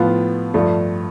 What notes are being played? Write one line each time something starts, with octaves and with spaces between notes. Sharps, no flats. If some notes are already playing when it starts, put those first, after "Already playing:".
Already playing: A2 F3 B3 F4
G2 F3 A3